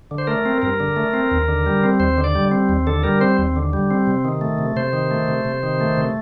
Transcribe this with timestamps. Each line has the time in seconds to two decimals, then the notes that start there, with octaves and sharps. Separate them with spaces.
0.11 D3
0.18 C5
0.27 A3 A#4
0.45 C4
0.62 G2 A#4
0.80 D3
0.96 A3
1.13 C4
1.31 D#2
1.48 D3
1.66 G3
1.83 C4
2.00 D#2 C5
2.18 D3
2.24 D5
2.35 G3
2.51 C4
2.69 D#2
2.87 D3 A4
3.03 G3 A#4
3.21 C4 C5
3.38 D#2
3.56 D3
3.73 G3
3.91 C4
4.07 C3
4.25 D#3
4.41 A3
4.59 C3
4.76 C3 C5
4.93 D#3
5.11 A3
5.28 C3
5.45 C3
5.63 D#3
5.80 A3
5.97 C3